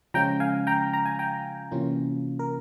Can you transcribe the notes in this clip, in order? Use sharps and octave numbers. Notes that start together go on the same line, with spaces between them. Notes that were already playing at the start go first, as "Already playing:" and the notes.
C#3 F3 G#3 C#4 F4 G5 A#5
F5 G#5
G5 A#5
A#5
G#5
G5 A#5
C3 E3 A#3 C#4 F4
A#4